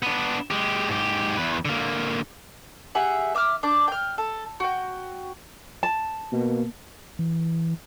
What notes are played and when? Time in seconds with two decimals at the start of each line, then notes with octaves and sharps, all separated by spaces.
0.03 B3 D4
0.51 G#3 G4
0.89 G#2 G4
1.37 E2 B4
1.65 D3 A#3
2.95 G4 G#4 E5 F#5
3.35 E5 D6 D#6 F6
3.63 D4 D6 G6
3.88 G5 F6
4.18 A4
4.60 F#4 G5
5.83 A5
6.32 B2 A#3
7.19 E3